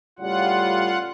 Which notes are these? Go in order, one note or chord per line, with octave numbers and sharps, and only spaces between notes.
A2 C#3 G3 F4 F#5